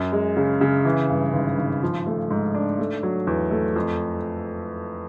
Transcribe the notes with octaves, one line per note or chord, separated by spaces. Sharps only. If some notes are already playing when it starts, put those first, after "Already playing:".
Already playing: F#2
G#3
C#3
C#3
E3
G2
G#1
G#1
F3
A3
G#2
D4
A3
F#3
E2
A3
F2